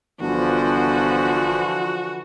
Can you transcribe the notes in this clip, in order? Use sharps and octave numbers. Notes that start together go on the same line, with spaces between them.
G1 D3 E3 F3 F#4